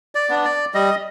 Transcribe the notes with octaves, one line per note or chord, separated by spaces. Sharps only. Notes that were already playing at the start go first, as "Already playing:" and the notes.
D5
B3 D4
D5
G3 D#5